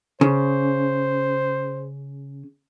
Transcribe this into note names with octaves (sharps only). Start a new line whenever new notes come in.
C#3 C5